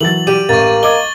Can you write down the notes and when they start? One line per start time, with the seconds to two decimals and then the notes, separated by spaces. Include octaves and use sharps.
0.01 E3 F#3 A6 F#7
0.27 G3 G4 D#7
0.49 A1 A#3 C#6 A6
0.83 D#5 D6 G#6 G7